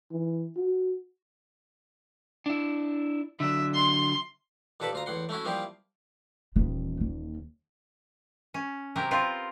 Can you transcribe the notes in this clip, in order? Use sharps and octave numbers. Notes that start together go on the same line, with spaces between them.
E3
F#4
D4 E4
D3 F#3 E5
C6
D#2 A#2 A4 B4 A5 B5
D2 F4 A#5
E2 A2 F#5 C6
A3 C#4 E4 F#4
F3 G3 A#3 E4 F4 G4
D#1 E3 B3
A#3
C#4
C3 F#3 G4 A#4
B3 C4 F4 A#4